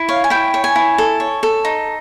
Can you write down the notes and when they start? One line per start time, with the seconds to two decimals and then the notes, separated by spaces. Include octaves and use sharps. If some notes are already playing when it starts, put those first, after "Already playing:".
Already playing: E4
0.09 C#5 F5
0.24 G#5
0.30 E4 G5
0.54 C#5
0.64 G#5
0.76 E4
0.98 A4
1.20 C#5
1.43 A4
1.65 D#4